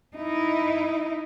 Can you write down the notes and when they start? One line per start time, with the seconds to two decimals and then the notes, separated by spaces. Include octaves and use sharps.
0.16 D#4 E4